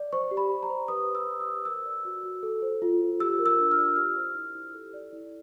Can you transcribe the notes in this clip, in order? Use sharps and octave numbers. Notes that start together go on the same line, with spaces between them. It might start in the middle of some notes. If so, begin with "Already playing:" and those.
Already playing: D5
C5 C#6
G4
B5
G4
A#5
C5
B4 D#6
D5
E6
G4
D#6
G4
A#4 E6
D5
F#4
F#4
A4
C5
F4
F4
G4 E6
A#4
E6
D4
F6
D5
G4 F6
C5
E4
E4
A4
D5
E4